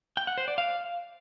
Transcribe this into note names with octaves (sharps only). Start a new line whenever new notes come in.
G5
F#5
C5
D5
F5